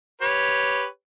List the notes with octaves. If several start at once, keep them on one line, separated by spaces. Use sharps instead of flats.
G4 B4 C#5